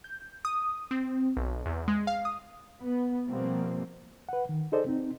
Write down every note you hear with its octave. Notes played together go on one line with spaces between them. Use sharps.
G6
D#6
C4
B1
E2
G#3
F5
D#6
B3
B2 F3 G3 A#3 C4
B4 F#5
D#3
D#4 G#4 A4 C5 D5 D#5
C4 D#4